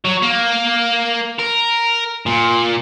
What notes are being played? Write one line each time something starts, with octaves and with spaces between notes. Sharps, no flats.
F#3
A#3
A#4
A#2